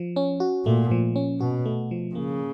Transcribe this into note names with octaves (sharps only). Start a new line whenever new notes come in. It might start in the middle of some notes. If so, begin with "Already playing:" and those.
Already playing: F3
C#4
F#4
A#2 A3
F3
C#4
B2 F#4
A3
F3
C#3 A#3